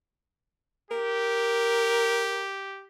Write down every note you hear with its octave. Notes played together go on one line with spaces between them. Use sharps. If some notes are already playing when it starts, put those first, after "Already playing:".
G4 A#4